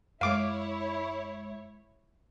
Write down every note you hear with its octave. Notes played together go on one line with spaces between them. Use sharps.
F#2 G#3 E4 C#5 F5 D6